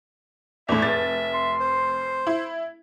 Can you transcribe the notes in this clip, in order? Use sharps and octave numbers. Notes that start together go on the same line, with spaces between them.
E2 A2 E5
F1 A6
C6
C5
E4